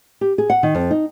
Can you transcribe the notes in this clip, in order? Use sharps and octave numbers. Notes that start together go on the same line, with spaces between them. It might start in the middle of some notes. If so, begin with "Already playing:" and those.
G4
G#4
F#5
D#3
F2
D#4